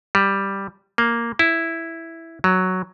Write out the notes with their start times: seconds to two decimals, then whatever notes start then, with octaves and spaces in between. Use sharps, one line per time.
0.15 G3
0.98 A#3
1.39 E4
2.44 F#3